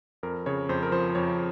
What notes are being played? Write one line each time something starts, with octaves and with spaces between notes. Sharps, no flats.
F2 A#4
C#3 C#5
F2 C5
A#4
F3 C5
F2 C#5